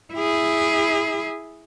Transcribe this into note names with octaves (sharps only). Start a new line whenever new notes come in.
E4 G#4